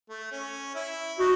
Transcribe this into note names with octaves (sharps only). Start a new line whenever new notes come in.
A3
C#4
E4
D#4 F#4